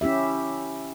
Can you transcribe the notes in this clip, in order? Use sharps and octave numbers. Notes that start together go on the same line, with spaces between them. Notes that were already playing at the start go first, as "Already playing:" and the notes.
C#4 E4 G4 E5